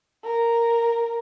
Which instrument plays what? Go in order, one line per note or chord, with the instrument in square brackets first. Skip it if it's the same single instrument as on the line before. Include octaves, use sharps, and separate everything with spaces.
[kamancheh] A#4